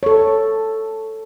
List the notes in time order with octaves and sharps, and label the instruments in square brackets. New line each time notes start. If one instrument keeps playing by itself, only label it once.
[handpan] A4 C#5